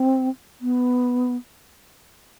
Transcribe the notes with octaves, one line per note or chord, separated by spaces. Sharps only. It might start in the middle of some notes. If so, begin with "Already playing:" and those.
Already playing: C4
B3